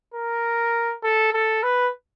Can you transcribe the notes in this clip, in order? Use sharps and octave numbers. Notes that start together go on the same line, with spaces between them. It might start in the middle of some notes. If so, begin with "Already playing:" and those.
A#4
A4
A4
B4